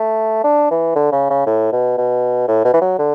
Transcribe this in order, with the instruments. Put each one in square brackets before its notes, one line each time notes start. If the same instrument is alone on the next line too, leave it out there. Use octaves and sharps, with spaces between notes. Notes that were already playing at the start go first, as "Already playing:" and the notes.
Already playing: [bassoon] A3
D4
E3
D3
C#3
C#3
A2
B2
B2
A2
B2
E3
F#3
D3